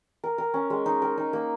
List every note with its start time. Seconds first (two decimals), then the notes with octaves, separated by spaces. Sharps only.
0.24 A#4
0.38 A#4
0.54 C#4
0.70 G#3
0.86 D#4
1.02 A#4
1.18 D#4
1.33 A#3